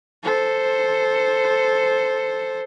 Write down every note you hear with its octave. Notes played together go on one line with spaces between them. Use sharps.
A4 C5